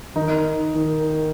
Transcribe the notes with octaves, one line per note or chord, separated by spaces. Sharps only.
D#3 D#4
D#3